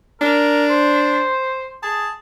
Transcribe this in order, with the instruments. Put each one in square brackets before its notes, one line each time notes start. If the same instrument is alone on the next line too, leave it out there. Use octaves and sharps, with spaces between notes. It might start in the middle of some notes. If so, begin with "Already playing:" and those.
[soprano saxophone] D4 [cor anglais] A#4
[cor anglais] C5
[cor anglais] G#4 [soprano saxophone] A5